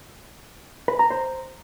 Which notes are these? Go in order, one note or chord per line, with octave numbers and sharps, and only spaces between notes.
B4
A#5
C5